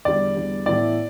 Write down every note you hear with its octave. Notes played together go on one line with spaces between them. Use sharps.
E2 D3 G3 D5
E2 D3 G3
A2 E3 B3 E4 D5